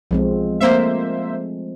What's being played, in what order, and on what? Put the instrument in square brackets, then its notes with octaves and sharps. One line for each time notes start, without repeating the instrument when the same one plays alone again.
[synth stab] B1 [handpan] F3 G#3 C4
[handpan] A3 C4 [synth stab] A#3 C5 E5